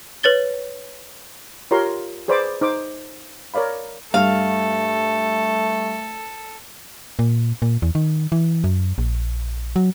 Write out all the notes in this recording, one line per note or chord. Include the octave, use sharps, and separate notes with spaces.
B4 C#5 A6 G7
F4 G4 A#4 C#5 A#5 C6
G#4 B4 C5 D5 B5 D6
D#4 C5 D6
A#4 C#5 D5 F5 B5
G2 A3 A4 F5
A#2
A#2
E2
D#3
E3
F#2
A#1
F#3